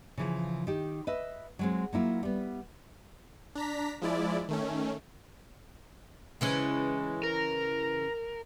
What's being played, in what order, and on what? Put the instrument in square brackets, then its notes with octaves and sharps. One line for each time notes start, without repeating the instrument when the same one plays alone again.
[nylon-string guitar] C#3 E3 F3
D#3 G4
B4 D#5 E5
F#3 G#3 C4
F#3 A#3 E4 F4
G3 B3
[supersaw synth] D4 A#5 B6
F3 G#3 E4 D5
D#3 A3 C#4
[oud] C#3 E3 C#4 [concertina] G#3
[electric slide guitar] A#4 [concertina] A#5